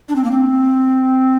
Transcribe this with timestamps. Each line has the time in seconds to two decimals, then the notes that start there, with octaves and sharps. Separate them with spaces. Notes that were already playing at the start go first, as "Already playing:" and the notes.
0.09 D4
0.16 C4
0.24 A#3
0.31 C4